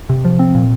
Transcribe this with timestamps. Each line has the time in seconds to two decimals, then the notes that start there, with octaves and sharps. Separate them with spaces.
0.09 C3
0.25 F3
0.39 C4
0.55 A#2